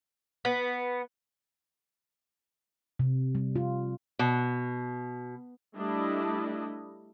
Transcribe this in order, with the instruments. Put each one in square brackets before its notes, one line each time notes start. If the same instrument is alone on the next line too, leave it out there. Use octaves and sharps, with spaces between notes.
[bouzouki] B3
[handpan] C3
G3
F4
[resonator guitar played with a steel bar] B2
[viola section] G3 A3 D4 E4 D#5